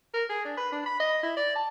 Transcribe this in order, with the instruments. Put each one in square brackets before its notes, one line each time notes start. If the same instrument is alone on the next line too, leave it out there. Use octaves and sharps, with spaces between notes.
[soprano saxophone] A#4
G#4
D4
B4
D4
B5
D#5
E4
D5
A5